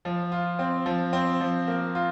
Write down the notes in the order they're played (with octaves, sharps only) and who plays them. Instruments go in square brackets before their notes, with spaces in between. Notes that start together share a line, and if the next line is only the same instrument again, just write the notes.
[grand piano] F3
F4
C4
F3
C4
F3
A#3
F4